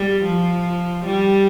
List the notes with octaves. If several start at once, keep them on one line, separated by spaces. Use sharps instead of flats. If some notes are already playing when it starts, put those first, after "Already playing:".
Already playing: G3
F3
G3